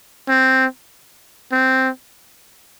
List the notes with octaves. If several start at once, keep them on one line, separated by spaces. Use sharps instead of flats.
C4
C4